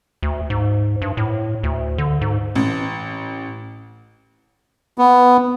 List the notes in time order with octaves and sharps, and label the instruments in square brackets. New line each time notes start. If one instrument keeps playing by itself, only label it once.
[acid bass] D2
G#2
G2
A2
D2
D3
G#2
[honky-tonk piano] A1
[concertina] B3